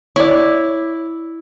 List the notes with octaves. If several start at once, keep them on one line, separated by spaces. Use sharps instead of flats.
E4 C#5 D5